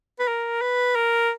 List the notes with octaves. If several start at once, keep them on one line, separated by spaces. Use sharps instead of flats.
B4
A#4
B4
A#4